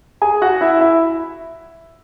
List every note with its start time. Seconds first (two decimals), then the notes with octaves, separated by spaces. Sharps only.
0.22 G#4 G#5
0.42 F#4 F#5
0.61 E4 E5
0.81 E4 E5